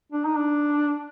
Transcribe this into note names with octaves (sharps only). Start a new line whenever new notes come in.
D4
D#4
D4